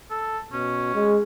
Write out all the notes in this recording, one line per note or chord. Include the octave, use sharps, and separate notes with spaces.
A4
B2 C#4
G#3